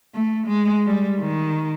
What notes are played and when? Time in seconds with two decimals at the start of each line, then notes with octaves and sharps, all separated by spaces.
0.14 A3
0.47 G#3
0.86 G3
1.20 D#3